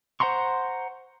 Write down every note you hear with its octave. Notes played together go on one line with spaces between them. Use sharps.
C5 F#5 A#5 C6 C#6